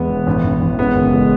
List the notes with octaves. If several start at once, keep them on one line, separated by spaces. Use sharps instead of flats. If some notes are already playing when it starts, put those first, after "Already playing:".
Already playing: E2 G#3 B3
E1
A1
A1
A1
G#3 B3
F#1
G#3